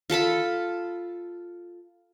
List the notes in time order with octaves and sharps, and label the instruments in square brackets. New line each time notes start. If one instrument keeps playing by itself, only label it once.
[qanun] F4 A4 A5 B5